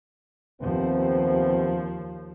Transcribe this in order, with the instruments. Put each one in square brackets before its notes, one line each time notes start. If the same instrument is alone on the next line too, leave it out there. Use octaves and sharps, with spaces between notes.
[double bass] D#2 F3 [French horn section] C3 B3 C4